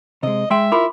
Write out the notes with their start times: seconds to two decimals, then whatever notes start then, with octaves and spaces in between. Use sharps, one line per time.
0.23 C3 G#3 D#5
0.51 G#3 E5 G5 C6
0.72 E4 F4 A#4 B5 C6 D6